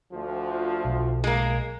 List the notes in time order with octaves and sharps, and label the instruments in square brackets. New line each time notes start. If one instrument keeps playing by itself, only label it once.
[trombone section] D2 F3
[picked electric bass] B1
[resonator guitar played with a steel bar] G#3 A#3